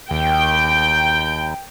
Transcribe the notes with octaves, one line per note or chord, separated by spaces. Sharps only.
D#2 G5